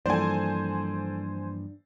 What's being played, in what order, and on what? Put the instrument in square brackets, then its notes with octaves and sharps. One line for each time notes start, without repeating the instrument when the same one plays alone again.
[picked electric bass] G2 [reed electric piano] E3 F3 A#3 [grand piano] A4 D5 [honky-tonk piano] C5 G#5